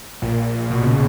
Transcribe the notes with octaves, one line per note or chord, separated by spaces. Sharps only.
A#1 A#2
B2
C#3